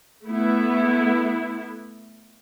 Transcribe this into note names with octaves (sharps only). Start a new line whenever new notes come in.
A3 B3 E4